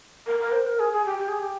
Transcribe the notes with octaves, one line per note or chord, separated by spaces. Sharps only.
A#4
A#4
C5
A#4
G#4
G#4
G4
G4
G#4
G4